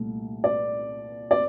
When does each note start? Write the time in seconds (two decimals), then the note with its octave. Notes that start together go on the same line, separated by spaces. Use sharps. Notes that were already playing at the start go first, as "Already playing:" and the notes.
Already playing: C2 A#2 A3
0.44 D5
1.31 D5